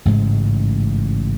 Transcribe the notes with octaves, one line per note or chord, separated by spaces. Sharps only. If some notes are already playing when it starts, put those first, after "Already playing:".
A1 G#2 C#3 G#3